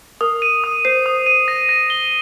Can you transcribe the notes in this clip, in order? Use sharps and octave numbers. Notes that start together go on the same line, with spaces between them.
A#4 D#6
D#7
D#6
C5 C7
D#6
D#7
A#6
A#6
G7